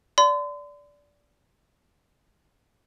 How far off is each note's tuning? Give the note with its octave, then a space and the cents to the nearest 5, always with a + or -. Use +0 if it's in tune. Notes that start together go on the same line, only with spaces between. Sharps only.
D5 -15 C6 -40